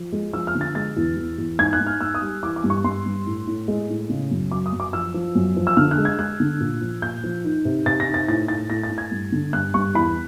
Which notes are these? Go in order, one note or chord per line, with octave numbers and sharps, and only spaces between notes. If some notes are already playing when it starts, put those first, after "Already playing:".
Already playing: F3
G#3
F3 E6
F6
D3
A6
G#3 A6
E2
E2
E2
G#2 G#6
F#6
G#2
F6
G#2 E6
D#6
G3
E3 D6
D6
G2
C#6
G2 C6
G2
A2
A2
G#3
A2
C#3
F#2
F#3 D6
D#6
F#2
D6
F3 E6
F3
F#2
F3
E6
D3 F6
F#6
G#3
G#6
G#3 F#6
D3
A#2
F3
A#2 G6
F3
D#3
C3
C3 A6
A#6
D#3
A6
A2 A6
A2 A6
A2 A#6
A6
A2
G#6
G2
D3
G2 F#6
G2 C#6
E2 B5